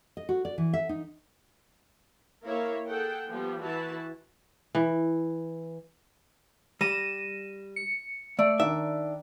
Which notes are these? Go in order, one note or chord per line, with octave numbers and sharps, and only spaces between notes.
D#5
F#4
D5
E3
E5
D#4
A#3 E4 A#4 C#5 E5 F5
G#4 A4 F#5 G5
F3 G3 B3
E3 E4 F#4 A5
E3
G3 A#6 D#7 E7
C#7
A3 D5
D#3 D4 E5